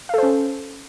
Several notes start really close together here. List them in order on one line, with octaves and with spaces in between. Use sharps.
F5 A4 C5 C#4